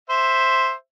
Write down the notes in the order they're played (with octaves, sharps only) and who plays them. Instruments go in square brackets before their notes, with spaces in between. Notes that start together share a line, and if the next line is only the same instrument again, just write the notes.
[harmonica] C5 E5